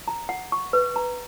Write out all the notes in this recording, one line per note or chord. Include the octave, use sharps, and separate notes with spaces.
A#5
F#5
C#6
B4
A#5